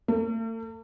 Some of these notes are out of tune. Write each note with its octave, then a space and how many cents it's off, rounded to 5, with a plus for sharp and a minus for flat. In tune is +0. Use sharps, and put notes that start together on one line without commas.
A3 +45